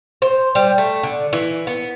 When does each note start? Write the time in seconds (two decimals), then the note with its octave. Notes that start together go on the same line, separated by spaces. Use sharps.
0.22 C5
0.55 G3
0.78 A3
1.03 D3
1.33 E3
1.67 B3